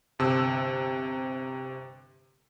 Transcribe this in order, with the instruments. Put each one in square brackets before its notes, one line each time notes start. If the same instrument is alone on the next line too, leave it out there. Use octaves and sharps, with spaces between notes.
[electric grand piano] G1 C3 A5 E6